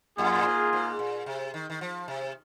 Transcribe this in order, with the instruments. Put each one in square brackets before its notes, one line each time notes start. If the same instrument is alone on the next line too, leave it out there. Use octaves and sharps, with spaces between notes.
[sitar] F2 [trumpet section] A#3 F4 G#4
[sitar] A#2
G#2
G#2
A#2
C3
D#3
D#3
F3
C3